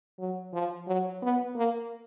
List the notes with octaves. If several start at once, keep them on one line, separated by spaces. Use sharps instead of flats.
F#3
F3
F#3
B3
A#3